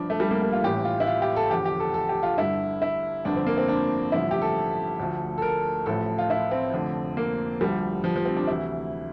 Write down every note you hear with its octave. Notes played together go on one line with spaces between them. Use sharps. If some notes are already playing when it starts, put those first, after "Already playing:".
Already playing: G1 G2 F3 D4
A3
G3
A#3
A#3
F4
A1 A2 E3 G4
F4
E4
F4
G4
A4
E2 D3 F3 G4
G4
A4
A4
G4
F4
G1 G2 D3 E4
E4
G1 F2 D3 F3 D4
C4
A#3
C4
D4
A1 G2 D3 F3 E4
G4
A4
D2 D3 F3
A4
A#4
A1 A2 F3 A4
F4
E4
C4
F1 F2 D3 F3
A#3
D2 D3 F3 G3
F3
F3
C4
D4
D2 C3 E3 E4